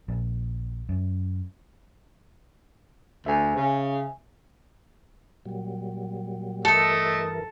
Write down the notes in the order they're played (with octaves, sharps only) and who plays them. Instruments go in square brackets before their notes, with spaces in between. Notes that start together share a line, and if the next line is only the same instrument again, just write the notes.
[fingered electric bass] A#1
F#2
[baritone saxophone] D2 [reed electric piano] E5 G#5
[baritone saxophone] C#3
[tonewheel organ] A#2 F#3 G3
[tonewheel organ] G2 E3 A#4 [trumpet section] A3 D#5 [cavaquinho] A4